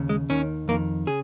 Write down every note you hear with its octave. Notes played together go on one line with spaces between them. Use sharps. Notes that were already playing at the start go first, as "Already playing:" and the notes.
Already playing: D#2 C#3
G#3
D#2 D#3 C#4
F2 D#3 A#3
C#3 G#4